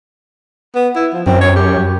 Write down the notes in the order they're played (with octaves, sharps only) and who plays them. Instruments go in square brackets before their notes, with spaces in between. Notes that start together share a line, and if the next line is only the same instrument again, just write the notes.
[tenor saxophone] B3
E4
F3
[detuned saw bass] F#2 [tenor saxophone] C4
[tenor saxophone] C#5
G4